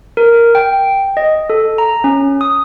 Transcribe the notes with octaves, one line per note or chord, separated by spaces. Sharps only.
A#4
G5
D#5
A4
A#5
C#4
D#6